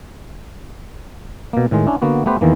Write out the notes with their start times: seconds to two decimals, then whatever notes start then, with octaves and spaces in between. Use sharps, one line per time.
1.53 B2 A#3
1.71 A2 D#3 G#3
1.86 C#4 D4 E4
2.02 D3 A#3 B3 F#4
2.26 A3 B3 G4 B4 C5
2.41 E2 D#3 E3 A#3